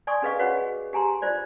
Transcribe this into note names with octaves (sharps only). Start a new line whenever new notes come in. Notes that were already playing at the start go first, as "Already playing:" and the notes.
D5 G#5 C6 C#6 D#6
C#4 G#4 B4 D#5 F5 C#6
F#4 B4 C#5 D#5 F#5 B5
G#4
G4 G#5 A#5 C6
F4 C5 D5